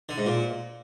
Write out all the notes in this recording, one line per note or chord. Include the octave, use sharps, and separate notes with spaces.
D3
G#2
A#2